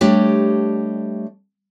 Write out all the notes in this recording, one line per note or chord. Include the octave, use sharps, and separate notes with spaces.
G3 A3 D4 G4 C#5 D#5